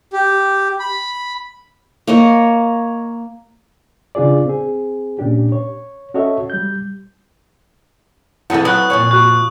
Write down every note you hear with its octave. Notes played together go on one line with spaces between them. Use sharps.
G4
B5
A#3 C#5 D#5
C#3 D4 F4 G#4 D5
C4 G#4
A#2 C#4 D4 G4
C#5
C#4 F#4 A4 C#5 D#5 E5
G3 G6
F2 E3 E4 G#4 F#5
F#3 B3 B4 D#6 F#6
F2 A#2 C#5 G#5
F#4 C#6 F#6